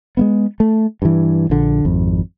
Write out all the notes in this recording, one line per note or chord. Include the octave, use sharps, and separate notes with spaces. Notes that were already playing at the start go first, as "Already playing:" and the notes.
G#3 A#3 B3
A3
G2 E3
A#1 D3
G#1 F2